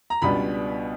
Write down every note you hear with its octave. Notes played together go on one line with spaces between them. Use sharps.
A#5
C#2 B2 G3 B3 D4 B5